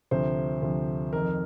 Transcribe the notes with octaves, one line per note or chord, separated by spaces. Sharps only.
D2 C3 F3 C5
D2 C3 F3
F2 D#3 A#4